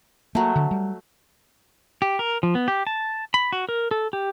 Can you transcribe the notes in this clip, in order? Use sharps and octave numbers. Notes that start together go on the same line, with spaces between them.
F#3 A3 A#3
D3
G3
G4
A#4
F3
B3
G4
A5
B5
F#4
A#4
A4
G4